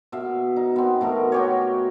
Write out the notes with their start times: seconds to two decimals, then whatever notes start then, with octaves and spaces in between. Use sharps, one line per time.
0.12 B2 E5 F5
0.56 D#4
0.76 B3 C4
1.01 B2 A3 A#4
1.32 F#4 G4 C#5